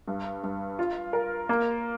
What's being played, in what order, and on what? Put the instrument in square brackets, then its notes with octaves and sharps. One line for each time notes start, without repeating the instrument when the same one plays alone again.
[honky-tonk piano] G2
G2
F4
A#4
A#3